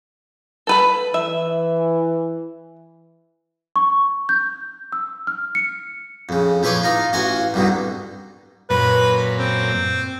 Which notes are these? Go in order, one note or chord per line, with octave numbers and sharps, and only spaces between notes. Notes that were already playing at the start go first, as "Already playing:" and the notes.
A4 B4 B5
E3 E5
C#6
G6
E6
F6
C#7
F2 C#3
F3 E4 B4 C#5 C6 D6
D#4 F4 F5
A1 F#4 F5 G#5 C6
C2 G2 B2 D3 D#3
F#2 A#2 B4
C4